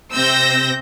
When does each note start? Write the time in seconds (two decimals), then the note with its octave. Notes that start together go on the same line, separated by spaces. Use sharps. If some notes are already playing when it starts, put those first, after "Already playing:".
0.12 C3 C4 E6 G6 A#6